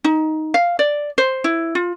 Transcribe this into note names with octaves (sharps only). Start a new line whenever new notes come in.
D#4
F5
D5
C5
E4
F4